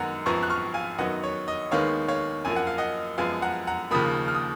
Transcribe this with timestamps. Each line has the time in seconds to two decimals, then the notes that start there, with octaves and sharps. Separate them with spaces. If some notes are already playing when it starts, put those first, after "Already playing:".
Already playing: F#2 D#3 G#3 B3 F#5 A#5
0.26 G#1 F#2 F3 B3 A#5 C#6
0.43 F#6
0.50 C#6 F6
0.74 F5 G#5
0.98 F#2 D#3 F#3 B3 D#5 F#5
1.24 C#5
1.48 D#5
1.71 D#2 D#3 G#3 B3 C#5 F5
2.08 C#5 F5
2.45 F#2 F3 A#3 G#5
2.56 F#5
2.67 F5
2.78 D#5 F#5
3.18 F#2 F3 G#3 B3 F5 G#5
3.42 F#5 A#5
3.67 F#5 A#5
3.91 D#2 C#3 F3 A#3 B5 D#6
4.28 F6
4.35 D#6